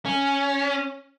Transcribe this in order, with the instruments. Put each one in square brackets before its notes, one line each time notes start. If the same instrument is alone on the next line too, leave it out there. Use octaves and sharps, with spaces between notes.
[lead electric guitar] C#4